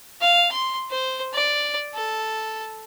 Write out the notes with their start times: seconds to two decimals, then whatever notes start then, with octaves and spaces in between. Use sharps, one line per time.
0.21 F5
0.51 C6
0.90 C5
1.33 D5
1.95 A4